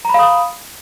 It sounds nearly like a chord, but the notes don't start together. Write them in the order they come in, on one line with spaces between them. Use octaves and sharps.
A#5 B5 F5 D#6